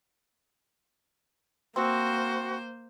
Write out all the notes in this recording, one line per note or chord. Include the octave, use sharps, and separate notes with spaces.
A#3 C4 F#4 C5